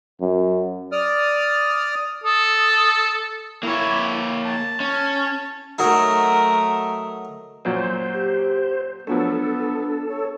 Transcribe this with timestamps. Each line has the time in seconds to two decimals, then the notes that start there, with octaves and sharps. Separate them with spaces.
0.21 F#2
0.92 D5 D#6 F6
2.24 A4 D#6
3.63 A#3 E4 C#5
4.43 A5
4.80 C#4
5.78 F#3 A3 D#4 A#4
7.65 F#2 A#2 F#3 C5
8.14 G4
9.07 F3 F#3 A3 B3 D4 A4
10.09 C#5